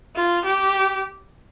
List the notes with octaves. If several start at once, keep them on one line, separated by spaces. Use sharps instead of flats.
F4
G4